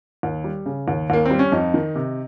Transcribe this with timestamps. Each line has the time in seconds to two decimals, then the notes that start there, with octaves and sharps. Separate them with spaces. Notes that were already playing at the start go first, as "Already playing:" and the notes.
0.23 D#2
0.44 G3
0.66 C#3
0.88 D#2
1.10 D#2 A#3
1.25 G3 C4
1.39 C#4
1.52 F2 D#4
1.74 D#3
1.95 C3